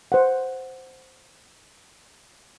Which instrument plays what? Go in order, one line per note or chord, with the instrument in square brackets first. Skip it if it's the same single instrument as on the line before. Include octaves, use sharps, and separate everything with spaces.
[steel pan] C5 F#5